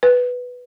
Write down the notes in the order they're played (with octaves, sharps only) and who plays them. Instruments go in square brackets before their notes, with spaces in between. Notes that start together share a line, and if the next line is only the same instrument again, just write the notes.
[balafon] B4